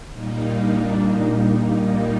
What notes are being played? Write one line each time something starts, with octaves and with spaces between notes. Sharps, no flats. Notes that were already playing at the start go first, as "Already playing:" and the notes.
A#2 G3 A#3 D#4
D4
A#2 G3 A#3 D#4